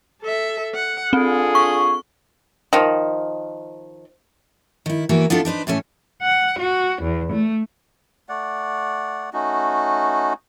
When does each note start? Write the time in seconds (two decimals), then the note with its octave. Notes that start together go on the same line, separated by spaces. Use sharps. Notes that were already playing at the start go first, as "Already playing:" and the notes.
0.22 A4 E5
0.75 F#5
1.13 C4 D4 F4 G#4 A4
1.55 C#6
2.73 D#3 F3
4.86 D#3 E4
5.09 E3 A#3 B3 F#4
5.30 B3 D4 E4 F4 A4
5.45 D4 D#4 B4 C5
5.67 A2 E3 A3 C#4
6.22 F#5
6.59 F#4
7.02 E2
7.32 A3
8.29 A3 D5 F#5
9.33 A3 C#4 D#4 F#4